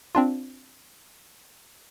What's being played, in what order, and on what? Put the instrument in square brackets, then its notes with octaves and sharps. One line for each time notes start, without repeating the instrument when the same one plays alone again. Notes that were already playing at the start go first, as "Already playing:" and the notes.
[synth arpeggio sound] C4 D4 F4